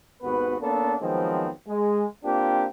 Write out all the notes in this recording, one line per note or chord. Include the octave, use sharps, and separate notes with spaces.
G#1 D#2 B3 F#4 B4
A#3 B3 C#4 D4 A4
D#3 F3 F#3 G#3 B3 C4
G#3
A#3 C4 D4 F4 G4